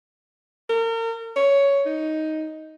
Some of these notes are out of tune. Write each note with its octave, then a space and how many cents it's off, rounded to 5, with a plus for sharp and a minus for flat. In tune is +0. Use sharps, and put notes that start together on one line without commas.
A#4 -35
C#5 +10
D#4 +5